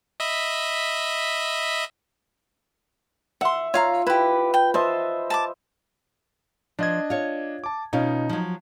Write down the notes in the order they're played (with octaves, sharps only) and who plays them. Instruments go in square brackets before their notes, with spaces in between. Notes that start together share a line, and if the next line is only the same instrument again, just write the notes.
[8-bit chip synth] D#5 E5 B5
[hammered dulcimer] E5 [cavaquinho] F#5 C6
[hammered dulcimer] F4 [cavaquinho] C#5 F5 A#5
[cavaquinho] E4 G4 [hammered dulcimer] B4
[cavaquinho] G5
[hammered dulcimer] C5 D#5 E5 [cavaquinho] A5
[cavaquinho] A5 A#5 D6
[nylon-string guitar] F3 [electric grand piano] D4 D#5 G#6
[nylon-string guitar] F4 C#5
[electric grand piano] A5 D6
[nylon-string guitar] B2 C#4 F4 [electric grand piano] D#4
[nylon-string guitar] F3 F#3